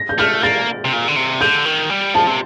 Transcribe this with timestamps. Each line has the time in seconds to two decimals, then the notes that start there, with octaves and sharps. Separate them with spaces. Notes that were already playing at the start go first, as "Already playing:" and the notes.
Already playing: A#6
0.09 G6
0.18 A3 F6
0.43 A#3 A6
0.85 C3
0.93 A#2
1.08 D3
1.16 C3
1.41 D3 G6
1.65 D#3
1.90 G3
2.14 F3 A5
2.27 C3